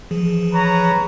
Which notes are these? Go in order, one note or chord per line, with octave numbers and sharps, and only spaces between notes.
E3 F3 G#4
B4 C#5 A#5